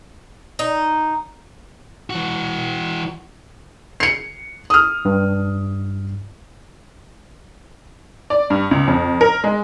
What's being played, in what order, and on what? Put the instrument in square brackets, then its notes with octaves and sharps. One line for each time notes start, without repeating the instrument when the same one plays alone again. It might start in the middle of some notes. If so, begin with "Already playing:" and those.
[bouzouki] D#4
[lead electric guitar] E3 F#4
[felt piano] C7 C#7
D#6 F6
[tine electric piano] G2
[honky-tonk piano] D5
G2
C#2
F2
A#4
G#3